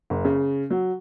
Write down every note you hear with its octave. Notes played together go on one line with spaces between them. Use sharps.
F#1
C#3
F#3